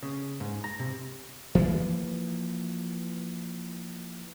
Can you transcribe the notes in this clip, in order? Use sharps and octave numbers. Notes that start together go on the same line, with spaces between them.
C#3
G#2
A#5
C3
E3 F3 A#3